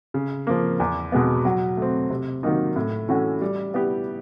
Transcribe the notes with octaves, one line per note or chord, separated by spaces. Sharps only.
C#3
F3 A#3
E2
B2 G#3 B3
F#3
A3 C4
C3
D#3 F#3 A#3 D#4
A2
E3 A3 C#4 F#4
G3
B3 E4 G4